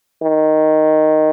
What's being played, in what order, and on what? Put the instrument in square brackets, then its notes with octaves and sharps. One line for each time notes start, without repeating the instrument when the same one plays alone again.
[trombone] D#3